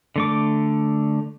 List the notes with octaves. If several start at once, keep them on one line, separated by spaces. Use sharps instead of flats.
D3 A3 D6